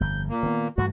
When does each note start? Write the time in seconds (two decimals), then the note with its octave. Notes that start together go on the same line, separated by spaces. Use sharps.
0.01 G1 F2 G6
0.29 A#2 A#3
0.43 D#3 B3
0.78 G2 E3 A3 F#4